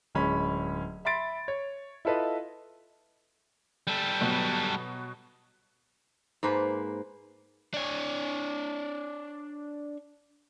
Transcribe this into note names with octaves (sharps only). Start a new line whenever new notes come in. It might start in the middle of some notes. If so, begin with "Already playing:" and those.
D1 G#3 C#4 B5
E5 B5 C6 A6 D7
C#5
E4 F4 A4 B4 D#5
G3 A4
B2 F#3 B3
G#2 A#3 B4 C5
D4 C#5